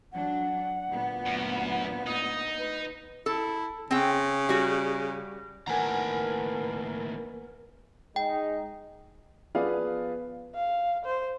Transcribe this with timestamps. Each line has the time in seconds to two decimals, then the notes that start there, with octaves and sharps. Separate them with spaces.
0.12 F#3 D4 F#5
0.89 D2 A#2 B3
1.26 F#2
2.06 D#4 D#6
2.59 B4
3.26 E4 A4
3.91 C#3 C4 G5
4.49 G3 F#4
5.67 D#2 A2 A#4 B4 F#5 G#5 A#5
8.16 G#3 D#4 G5
9.55 F3 B3 G#4 B4 D5 F5
10.55 F5
11.05 C5